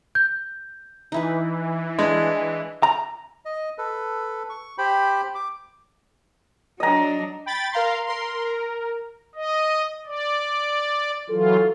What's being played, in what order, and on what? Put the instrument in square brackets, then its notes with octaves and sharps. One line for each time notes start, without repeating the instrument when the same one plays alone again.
[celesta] G6
[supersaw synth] E3 [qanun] D#4 E4 B4
[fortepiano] G#3 [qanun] D4
[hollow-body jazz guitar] A#5
[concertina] D#5
A4 B4
C#6
G4 C5 G5 B5
D6
[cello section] F#3 D4 [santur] D#5 A#5
[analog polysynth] G5 B5 A6
A#4 F5 A#5 C6
A#4 C6
A#4
[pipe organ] D#5
D5
[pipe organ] E3 F#3 F4 [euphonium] A4